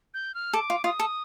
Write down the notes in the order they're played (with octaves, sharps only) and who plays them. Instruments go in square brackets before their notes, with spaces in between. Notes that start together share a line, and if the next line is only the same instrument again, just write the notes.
[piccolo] G6
F6
[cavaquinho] A4 [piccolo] D6
[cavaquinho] F4
[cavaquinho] F4 [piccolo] D#6
[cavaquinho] A4